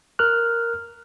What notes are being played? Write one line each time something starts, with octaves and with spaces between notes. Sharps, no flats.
A#4 F6 F#6